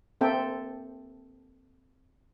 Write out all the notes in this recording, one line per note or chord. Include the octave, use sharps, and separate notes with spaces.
A#3 C4 A4 E5 G5